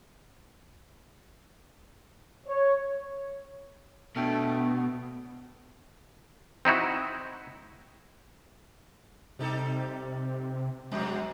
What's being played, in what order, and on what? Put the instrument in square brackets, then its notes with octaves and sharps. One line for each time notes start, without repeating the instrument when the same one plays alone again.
[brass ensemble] C#5
[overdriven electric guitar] B2 [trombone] A3 [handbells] D4 G5 F6
[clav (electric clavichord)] C4 D#4 E4 F#4
[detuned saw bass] C3 [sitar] G3 D#4 A4
[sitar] F2 B2 F#3 [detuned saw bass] G#3